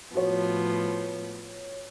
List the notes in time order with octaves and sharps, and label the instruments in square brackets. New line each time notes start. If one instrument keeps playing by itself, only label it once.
[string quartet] A2 F3 B3 [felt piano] F#4 C#5